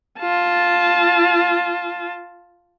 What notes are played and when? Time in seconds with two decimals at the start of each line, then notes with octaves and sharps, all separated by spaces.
0.20 F4 A5